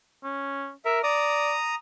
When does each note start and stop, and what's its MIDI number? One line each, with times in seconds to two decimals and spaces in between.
0.24 0.71 61
0.85 0.99 70
0.85 0.99 76
1.03 1.54 74
1.03 1.75 82
1.03 1.75 87